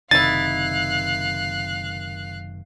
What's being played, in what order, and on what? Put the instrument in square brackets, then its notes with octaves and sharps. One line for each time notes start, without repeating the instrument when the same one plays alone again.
[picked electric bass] F#1 C3 D#3 [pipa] D#4 E4 [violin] F5 F#6 [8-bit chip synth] A6